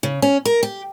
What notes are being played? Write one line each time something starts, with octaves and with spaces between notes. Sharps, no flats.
C#3
C#4
A#4
G4